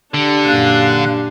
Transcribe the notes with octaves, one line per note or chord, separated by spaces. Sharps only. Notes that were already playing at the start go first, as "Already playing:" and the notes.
D3 D4 G4
F#2 A#2 F5 F#6